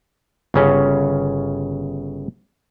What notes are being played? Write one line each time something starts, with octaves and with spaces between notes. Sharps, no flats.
G1 C#3 C#4